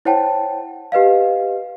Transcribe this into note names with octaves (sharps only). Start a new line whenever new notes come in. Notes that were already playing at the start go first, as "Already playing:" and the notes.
E4 C5 C#5 F#5 G5 A5
G4 B4 D#5 F5